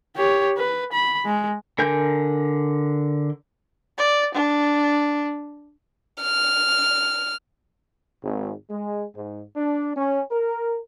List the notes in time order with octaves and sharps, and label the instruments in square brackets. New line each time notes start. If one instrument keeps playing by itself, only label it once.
[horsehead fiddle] G4 C#5
B4
B5
G#3
[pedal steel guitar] D3 A#4 G#5 G6
[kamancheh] D5
D4
[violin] F6
[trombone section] G#1
G#3
G#2
D4
C#4
A#4